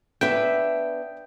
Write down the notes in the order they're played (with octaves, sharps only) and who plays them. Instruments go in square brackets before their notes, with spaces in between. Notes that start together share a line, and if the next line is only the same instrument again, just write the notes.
[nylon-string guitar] B3 D4 B4 [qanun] E5 [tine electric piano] G5